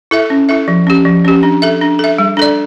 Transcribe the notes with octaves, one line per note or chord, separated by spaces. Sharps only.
E4 A4 E5
C#4
E4 A4 E5
F3
C#4 G4
F3
C#4 G4
D4
A4 E5
D4
A4 E5
G3
D4 A4 D5